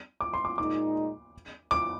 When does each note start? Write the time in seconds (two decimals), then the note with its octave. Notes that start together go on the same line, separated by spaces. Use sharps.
0.21 D6
0.34 C6
0.45 D6
0.58 A#2 G#3 D#4 D6
1.71 D6